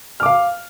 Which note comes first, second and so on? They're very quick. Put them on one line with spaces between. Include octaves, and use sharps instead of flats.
F6 D6 F5